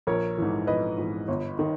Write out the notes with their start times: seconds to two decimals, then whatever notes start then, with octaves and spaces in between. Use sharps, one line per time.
0.07 A#1 A#4 C#5
0.38 G#2 E3
0.67 A#1 B4 D#5
0.98 G#2 E3
1.28 G1
1.59 D#3